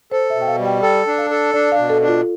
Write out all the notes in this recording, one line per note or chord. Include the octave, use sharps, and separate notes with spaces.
A4 C5
E5
B2
G5
F5
G3
G5
A4 G5
D4
F5
A4
D4 D5
F5
B2
A4
D4
F4